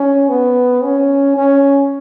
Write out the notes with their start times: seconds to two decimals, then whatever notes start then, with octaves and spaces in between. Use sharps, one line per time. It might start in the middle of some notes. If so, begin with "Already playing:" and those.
Already playing: C#4
0.29 B3
0.83 C#4
1.37 C#4